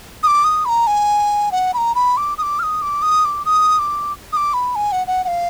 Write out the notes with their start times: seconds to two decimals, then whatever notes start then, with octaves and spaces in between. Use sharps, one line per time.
0.23 D#6
0.27 D6
0.44 D#6
0.65 B5
0.69 A#5
0.87 G#5
1.52 F#5
1.74 B5
1.77 A#5
1.95 B5
2.17 D6
2.38 D#6
2.42 D6
2.59 F6
2.63 D#6
2.82 D6
3.02 D#6
3.25 D6
3.45 D#6
3.79 D6
4.32 D#6
4.37 D6
4.53 B5
4.75 G#5
4.92 F#5
5.07 F#5
5.24 F#5
5.28 F5